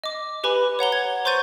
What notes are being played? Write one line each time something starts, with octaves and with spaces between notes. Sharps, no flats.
D#5 D6
G4 B4 G#5 B5
C#5 F#5 A#5 G7
G#6
C5 C6 C#6 G6 A6 D#7